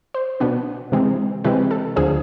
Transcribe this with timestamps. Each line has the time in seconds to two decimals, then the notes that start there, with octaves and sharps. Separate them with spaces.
0.14 C5
0.40 B2 B3 D4
0.92 C3 E3 G#3 C4
1.44 C3 E3 G#3 C4 B4
1.71 A4
1.96 D2 D3 F3 G#4